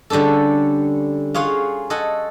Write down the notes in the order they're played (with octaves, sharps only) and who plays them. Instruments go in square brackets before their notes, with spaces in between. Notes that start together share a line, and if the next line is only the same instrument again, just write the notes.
[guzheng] D3 G3 C#4 D4 A4
F4 G#4 C#5 F5 F#5
A4 D#5 F#5 G#5